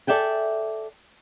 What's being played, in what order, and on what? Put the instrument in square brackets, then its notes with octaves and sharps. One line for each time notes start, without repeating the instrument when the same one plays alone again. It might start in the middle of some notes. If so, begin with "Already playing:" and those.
[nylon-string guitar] A4 D5 E5 G5 G#5